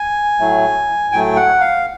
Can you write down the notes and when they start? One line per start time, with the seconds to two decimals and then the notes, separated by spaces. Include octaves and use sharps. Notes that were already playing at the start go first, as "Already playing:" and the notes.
Already playing: G#5
0.40 A2 F#3 A3
1.12 A2 F#3 A3 G5
1.36 F#5
1.61 F5